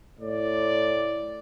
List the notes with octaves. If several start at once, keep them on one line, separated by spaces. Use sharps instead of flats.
A2 D5